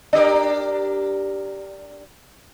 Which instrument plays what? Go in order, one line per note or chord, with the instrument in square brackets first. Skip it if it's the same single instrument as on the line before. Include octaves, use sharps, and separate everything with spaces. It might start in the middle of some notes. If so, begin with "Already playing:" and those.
[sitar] D4 G4 A#4